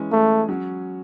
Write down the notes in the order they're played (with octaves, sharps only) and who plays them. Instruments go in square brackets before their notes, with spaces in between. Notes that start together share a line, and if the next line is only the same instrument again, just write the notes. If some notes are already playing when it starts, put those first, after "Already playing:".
Already playing: [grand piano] E3 G#3 C#4 G#4
[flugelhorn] A3
[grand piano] F#3 C#4